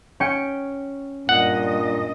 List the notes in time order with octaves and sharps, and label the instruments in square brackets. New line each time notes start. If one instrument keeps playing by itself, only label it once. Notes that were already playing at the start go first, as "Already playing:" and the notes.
[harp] C#4 G5 C#7
[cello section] G2 D#5 [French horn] A#2 [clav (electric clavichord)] F#5